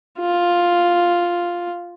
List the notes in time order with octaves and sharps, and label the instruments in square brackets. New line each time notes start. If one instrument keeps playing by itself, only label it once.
[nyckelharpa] F4